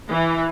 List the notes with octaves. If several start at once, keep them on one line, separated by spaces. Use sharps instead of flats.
E3